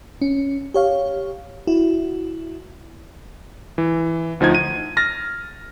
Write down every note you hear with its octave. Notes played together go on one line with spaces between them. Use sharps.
C#4
G4 C#5 F5
E4 F#4
E3
D2 F3 D#4 G#6
D#7
F6 A6 A#6